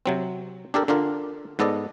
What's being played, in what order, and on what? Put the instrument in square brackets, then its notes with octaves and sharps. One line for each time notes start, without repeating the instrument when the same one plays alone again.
[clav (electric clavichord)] C3 F#3 C4
D4 G4 A4 A#4
D3 D4 F4 A#4
G#2 B3 A4 D5 D#5